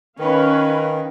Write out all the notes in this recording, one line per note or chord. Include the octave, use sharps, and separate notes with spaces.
D#3 C#4 B4 F5